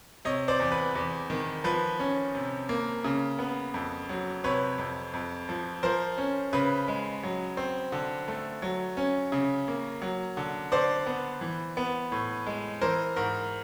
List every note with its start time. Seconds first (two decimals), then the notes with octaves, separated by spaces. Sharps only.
0.25 C3 C#5 D#5
0.48 C5 D5
0.60 E2
0.72 B4
0.95 E2
1.30 D#3
1.64 F3 B4
1.99 C#4
2.35 C3
2.69 A#3
3.04 C#3
3.39 B3
3.74 F2
4.09 F#3
4.44 C3 B4 C#5
4.78 F2
5.14 F2
5.49 F3
5.83 F3 A#4 C5
6.18 C#4
6.53 C#3 B4
6.88 G#3
7.23 F#3
7.57 C4
7.92 D3
8.28 A3
8.62 F#3
8.97 C#4
9.32 C#3
9.68 A#3
10.02 F#3
10.37 D3
10.72 D3 C5 D5
11.06 B3
11.41 E3
11.77 B3
12.12 A2
12.46 G#3
12.81 E3 A#4 C5
13.16 G#2 A#4